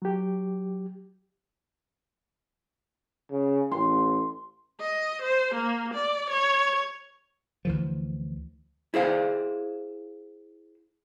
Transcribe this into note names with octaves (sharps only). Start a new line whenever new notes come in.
F#3 G4
C#3
A1 C6
D#5
C5
A#3
D5
C#5
D2 E3 F3
E4 G#4 C5 F5